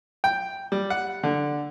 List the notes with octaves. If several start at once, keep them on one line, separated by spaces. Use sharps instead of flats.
G5
G3
F#5
D3